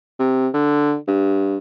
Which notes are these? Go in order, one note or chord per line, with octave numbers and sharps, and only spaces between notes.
C3
D3
G2